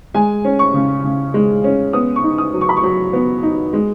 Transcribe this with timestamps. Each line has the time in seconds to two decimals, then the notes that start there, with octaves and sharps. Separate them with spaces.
0.14 G#3 G#5
0.45 C#4
0.59 C#6
0.74 C#3
1.04 C#3
1.34 G#3
1.64 C#4
1.93 B3 D#6
2.16 C#6
2.23 D#4
2.38 D#6
2.54 F#3
2.61 C#6
2.69 B5
2.77 C#6
2.83 F#3
3.13 B3
3.43 D#4
3.73 G#3